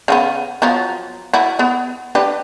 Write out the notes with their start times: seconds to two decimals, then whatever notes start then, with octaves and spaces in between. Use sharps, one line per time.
0.08 C#3 F#3 B3
0.62 F3 F#3 B3
1.33 E4 F#4
1.59 B3
2.15 D4 G4 B4